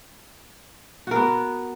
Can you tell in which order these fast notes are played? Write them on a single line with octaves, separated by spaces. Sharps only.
F#4 A#4 B3